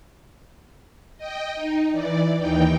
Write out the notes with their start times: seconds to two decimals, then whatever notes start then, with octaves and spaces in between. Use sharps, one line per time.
1.17 D#5 G5
1.55 D#4
1.91 E3 D5
2.38 D#2 E3 D#4 G5